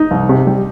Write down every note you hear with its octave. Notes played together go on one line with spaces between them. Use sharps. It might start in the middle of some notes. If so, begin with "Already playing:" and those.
Already playing: D#4
C2
C3
G3